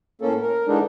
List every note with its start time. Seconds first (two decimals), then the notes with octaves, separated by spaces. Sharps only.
0.21 A2 A#3 C#4 A4
0.41 A#4
0.67 D3 E3 G#3 D4 D#4